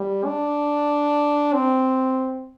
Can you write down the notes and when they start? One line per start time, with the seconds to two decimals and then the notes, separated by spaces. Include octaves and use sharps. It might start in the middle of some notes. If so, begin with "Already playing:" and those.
Already playing: G3
0.26 D4
1.54 C4